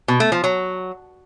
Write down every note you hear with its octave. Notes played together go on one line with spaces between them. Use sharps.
B2
A3
F3
F#3